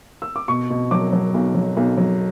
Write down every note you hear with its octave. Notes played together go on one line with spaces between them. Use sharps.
E6
D6
B2 C#6
B2
F#3 D6
F#3
B1
F#3
B1
F#3